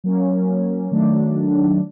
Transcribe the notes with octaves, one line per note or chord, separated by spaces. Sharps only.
F#3 A#3 C#4
D#3 F#3 A3 D4